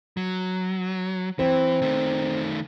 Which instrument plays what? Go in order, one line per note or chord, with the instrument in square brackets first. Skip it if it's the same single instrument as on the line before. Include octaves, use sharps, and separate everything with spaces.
[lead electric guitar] F#3
[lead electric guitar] E3 [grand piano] C4
[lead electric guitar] D#3 A3